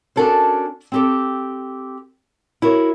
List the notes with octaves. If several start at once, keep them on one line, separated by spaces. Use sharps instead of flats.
C#4 D4 F#4 A4 A#4 C5
C4 G4 A4
E4 F#4 A#4 C#5